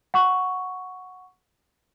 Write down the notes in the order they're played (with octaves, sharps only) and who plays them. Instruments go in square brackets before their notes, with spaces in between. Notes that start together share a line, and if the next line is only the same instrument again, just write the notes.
[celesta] F#5 C#6